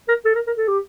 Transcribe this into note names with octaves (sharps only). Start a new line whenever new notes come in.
A#4
A4
A#4
A#4
A4
G4